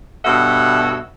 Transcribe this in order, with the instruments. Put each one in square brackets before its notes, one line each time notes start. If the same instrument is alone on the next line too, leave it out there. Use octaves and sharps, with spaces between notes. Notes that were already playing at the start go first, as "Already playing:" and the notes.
[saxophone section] G2 B2 A4 C#5 E5 F#5